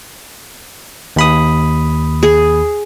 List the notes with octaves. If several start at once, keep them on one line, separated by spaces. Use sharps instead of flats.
D#2 B5 D#6
G#4